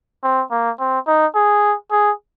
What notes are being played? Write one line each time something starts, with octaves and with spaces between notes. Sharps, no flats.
C4
A#3
C4
D#4
G#4
G#4